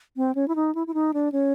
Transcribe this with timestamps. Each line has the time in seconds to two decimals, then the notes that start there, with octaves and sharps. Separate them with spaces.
0.16 C4
0.35 C#4
0.48 E4
0.55 D#4
0.75 E4
0.87 E4
0.94 D#4
1.14 D4
1.32 C#4